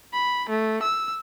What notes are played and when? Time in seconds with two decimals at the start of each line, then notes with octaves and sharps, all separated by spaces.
0.13 B5
0.50 A3
0.83 E6